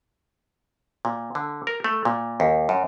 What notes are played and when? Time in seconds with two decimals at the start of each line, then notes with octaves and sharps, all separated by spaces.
1.05 A#2
1.35 D3
1.67 A#4
1.84 A3
2.05 A#2
2.40 D#2
2.69 F#2